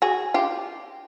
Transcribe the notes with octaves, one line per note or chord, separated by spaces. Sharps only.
F#4 G#4
F4 G4